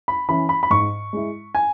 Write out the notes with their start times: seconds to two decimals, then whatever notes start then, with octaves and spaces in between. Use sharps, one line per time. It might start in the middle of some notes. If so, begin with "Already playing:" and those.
0.08 B5
0.29 E3 C#4 E4 B5
0.49 B5
0.63 B5
0.70 G#2 C#6
1.13 G#3 E4
1.55 G#5